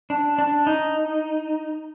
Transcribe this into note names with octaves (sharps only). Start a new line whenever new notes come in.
D4
D4
D#4